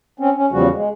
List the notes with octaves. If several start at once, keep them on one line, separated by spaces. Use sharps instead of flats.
C4 C#4
C#4
E2 C#3 F3 G3 F#4
G#3